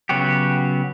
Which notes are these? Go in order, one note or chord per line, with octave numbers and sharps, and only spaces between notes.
C#3 F#3 B3 F#4 G4